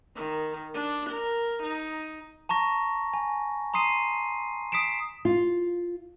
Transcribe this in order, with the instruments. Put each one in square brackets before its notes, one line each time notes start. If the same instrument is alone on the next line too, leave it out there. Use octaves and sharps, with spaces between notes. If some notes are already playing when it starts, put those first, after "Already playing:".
[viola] D#3
D4
A#4
D#4
[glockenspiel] A5 A#5 C#6 A#6
G#5
A#5 C6 D#6 C7 D#7
D#6 B6 C7 D7 E7
[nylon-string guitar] F4